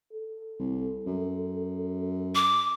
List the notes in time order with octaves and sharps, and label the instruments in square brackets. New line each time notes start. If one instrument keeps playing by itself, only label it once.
[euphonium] A4
[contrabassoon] C2
F#2
[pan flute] D6